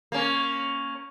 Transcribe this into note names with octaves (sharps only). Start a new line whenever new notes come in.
A#3 C#4